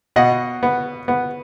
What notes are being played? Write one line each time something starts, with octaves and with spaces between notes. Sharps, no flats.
B2 D#5 F#5
B3
B3